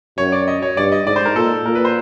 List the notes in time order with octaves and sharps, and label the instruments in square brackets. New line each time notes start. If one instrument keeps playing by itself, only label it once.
[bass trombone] F#2 [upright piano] C#5
[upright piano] D5
D#5
C#5
[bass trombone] G2 [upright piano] D5
[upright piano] D#5
[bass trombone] G#2 [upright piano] D5
[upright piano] C5
A#4
[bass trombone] A#2 [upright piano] A4
[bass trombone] A#2 [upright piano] A#4
[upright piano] B4
C5